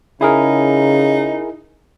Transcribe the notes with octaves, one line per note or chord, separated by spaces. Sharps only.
C#3 D#4 E4 G#4 A#4